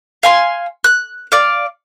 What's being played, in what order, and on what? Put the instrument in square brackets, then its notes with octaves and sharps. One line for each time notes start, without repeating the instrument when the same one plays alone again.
[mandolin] F5 G#5 C6
F#6
D5 F5